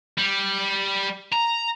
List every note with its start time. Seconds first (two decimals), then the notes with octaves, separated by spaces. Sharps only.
0.18 G3
1.32 A#5